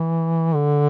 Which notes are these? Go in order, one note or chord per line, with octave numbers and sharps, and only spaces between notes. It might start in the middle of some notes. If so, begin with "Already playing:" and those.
Already playing: E3
D3